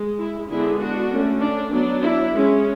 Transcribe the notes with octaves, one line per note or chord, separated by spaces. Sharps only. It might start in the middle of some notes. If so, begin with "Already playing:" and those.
Already playing: G#3
E4
D3 G#3 B3 D4 E4 G#4
D4 F#4
D3 A3 C#4
D4
F#3 B3 D4
E4
G#3 C#4